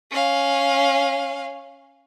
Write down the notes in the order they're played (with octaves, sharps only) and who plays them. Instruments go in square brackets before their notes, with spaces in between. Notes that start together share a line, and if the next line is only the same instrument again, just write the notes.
[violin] C#4 F5